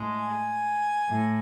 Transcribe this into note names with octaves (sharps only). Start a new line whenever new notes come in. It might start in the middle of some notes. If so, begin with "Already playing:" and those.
Already playing: A2 G#3
G#5
A2